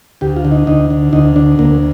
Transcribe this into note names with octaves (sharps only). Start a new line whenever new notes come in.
D2 G4
F4
D3
D#4
D2 D#4
D3
D2 D#4
D3 D4
D2 A#3